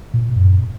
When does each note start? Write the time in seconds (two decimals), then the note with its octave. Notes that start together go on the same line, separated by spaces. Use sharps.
0.14 A#2
0.36 F#2